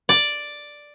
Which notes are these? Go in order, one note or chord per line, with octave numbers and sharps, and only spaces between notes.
D5